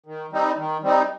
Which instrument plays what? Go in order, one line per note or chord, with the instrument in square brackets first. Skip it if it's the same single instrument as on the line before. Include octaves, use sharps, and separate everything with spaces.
[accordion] D#3
G3 C4 D#4
D#3
G3 C4 D#4